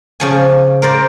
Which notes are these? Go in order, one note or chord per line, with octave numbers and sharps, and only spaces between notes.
C#3 F3 G#5
A#4 C5 D5